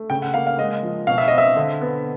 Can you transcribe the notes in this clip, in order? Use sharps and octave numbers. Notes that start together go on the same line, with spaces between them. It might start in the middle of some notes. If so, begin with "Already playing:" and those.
Already playing: A3
C#3 G5
F#5
A#3 F5
F5
G#3 D#5
F3
B2 F5
E5
C4 D#5
E5
D3
B3